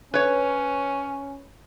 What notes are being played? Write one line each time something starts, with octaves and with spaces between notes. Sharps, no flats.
C#4 B4 C#5